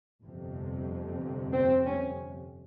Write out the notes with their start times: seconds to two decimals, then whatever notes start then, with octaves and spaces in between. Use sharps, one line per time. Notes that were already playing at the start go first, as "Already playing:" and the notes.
0.23 G1 F2 C3
1.52 C4
1.85 C#4